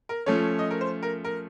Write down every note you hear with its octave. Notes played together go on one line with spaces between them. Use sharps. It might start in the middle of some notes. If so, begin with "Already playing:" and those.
A#4
F3 A3 C#4 C#5
D#5
A#4
C5
A#4
A#4